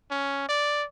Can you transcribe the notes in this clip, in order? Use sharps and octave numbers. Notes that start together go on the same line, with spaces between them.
C#4
D5